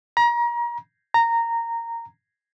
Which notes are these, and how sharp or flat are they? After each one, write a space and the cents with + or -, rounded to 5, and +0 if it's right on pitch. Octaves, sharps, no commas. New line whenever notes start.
A#5 +35
A#5 -10